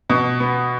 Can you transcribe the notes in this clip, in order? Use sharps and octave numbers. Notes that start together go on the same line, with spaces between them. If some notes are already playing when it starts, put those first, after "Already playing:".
B2
B3